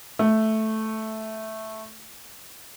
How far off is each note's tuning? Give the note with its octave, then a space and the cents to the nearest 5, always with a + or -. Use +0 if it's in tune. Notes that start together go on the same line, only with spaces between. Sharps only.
A3 -5